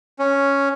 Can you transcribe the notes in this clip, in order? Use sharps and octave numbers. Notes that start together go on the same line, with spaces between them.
C#4